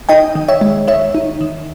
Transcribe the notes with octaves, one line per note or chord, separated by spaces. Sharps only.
D#4 D#5 G5
D#3
C#5 E5
G#3
D#3 C#5 E5
D#4
D#3